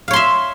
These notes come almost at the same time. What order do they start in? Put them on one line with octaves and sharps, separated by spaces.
F5 C#5 C6 E5